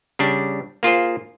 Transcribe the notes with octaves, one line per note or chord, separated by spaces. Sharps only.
C#3 G3 D4
A#3 F4 G#4 C5